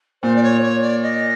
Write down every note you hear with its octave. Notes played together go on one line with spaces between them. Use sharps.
A#2 C5
D5
C#5
C#5
D5
D#5